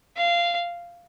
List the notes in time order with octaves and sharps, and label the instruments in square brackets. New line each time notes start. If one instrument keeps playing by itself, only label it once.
[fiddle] F5